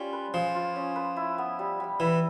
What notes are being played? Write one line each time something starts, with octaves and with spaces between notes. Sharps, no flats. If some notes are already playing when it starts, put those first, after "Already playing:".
Already playing: G3 C#4 F4
B4
F3 G#4
F4
C#4
B4
E4
B3
G3
G3
E3 E4